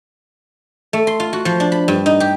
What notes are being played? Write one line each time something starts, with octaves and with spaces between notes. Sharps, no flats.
A3
C6
F4
F#4
F3
D4
B5
G2
D#4
G4